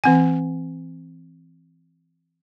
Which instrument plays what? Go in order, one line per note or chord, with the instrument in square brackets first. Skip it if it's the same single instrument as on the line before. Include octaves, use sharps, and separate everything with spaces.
[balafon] E3 C4 G#5